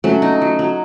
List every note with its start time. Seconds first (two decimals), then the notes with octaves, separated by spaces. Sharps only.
0.04 F#3 A3 C#4
0.22 D#4
0.41 F#3
0.59 F#3